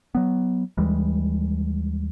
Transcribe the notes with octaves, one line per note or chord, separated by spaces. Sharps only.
F#3 B3
D#2 E3 G3 G#3